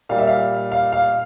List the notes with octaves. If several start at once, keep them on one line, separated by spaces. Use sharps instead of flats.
A#2 G3 F5
E5
F5
F5
F5